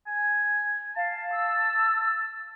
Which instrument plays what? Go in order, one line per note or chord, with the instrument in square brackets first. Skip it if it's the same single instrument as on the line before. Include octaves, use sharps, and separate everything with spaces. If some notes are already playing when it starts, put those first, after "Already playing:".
[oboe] G#5
[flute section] F5 [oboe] A5
[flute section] E6